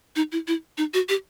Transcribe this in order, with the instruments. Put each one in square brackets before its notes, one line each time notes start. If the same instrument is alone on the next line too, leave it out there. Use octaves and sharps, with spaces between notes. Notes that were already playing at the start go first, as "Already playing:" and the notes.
[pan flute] D#4
E4
E4
D#4
F#4
G4